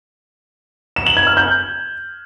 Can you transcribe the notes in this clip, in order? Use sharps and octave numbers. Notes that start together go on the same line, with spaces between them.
E7
F#7
G#6
F6
G6